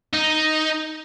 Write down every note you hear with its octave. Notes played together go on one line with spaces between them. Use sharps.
D#4